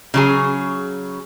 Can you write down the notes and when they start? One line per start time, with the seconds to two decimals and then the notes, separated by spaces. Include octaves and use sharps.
0.14 C#3 F#3 G#4